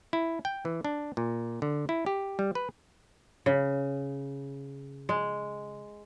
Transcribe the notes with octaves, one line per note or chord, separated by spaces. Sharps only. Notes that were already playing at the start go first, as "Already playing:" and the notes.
E4
G5
E3
D4
A#2
D3
E4
G4
G3
B4
C#3
G#3